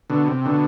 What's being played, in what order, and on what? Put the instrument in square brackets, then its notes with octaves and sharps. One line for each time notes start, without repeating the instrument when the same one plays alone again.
[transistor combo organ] B2 D3
C3
B2 D3